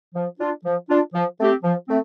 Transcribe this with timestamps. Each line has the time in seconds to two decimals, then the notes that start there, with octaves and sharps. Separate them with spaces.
0.15 F3
0.40 D4 F4
0.65 F3
0.89 D4 F4
1.14 F3
1.39 A3 C4 G4
1.63 F3
1.88 A3 C4